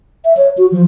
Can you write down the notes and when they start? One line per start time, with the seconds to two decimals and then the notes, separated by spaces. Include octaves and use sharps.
0.25 E5
0.37 C#5
0.58 F#4
0.72 F3